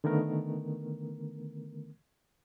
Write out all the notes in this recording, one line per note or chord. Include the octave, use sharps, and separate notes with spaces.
D3 D#3 A3 B3 A#4